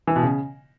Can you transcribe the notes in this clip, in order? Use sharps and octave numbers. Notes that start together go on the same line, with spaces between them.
E3
B2
C#3